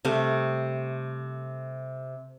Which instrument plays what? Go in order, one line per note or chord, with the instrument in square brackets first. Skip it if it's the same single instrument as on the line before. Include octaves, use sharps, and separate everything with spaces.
[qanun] C3 G3 A3